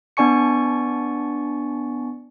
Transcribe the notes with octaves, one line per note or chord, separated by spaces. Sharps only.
B3 D4 D5 G#5 C#6 C#7